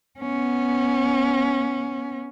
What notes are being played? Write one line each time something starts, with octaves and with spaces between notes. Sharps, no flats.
B3 C#4